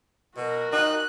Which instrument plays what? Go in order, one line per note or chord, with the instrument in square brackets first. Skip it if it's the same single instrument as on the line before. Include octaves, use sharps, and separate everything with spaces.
[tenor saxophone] B2 [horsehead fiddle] F#4 A#4
[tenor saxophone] D#4 [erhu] F#6